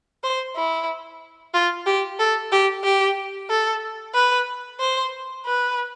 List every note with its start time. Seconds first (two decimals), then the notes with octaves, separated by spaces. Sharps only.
0.24 C5
0.56 E4
1.54 F4
1.86 G4
2.19 A4
2.52 G4
2.84 G4
3.50 A4
4.15 B4
4.80 C5
5.45 B4